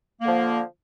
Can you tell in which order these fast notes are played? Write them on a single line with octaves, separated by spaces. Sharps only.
A#3 D3 F3